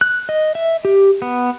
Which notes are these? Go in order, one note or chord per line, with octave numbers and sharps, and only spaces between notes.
F#6
D#5
E5
G4
B3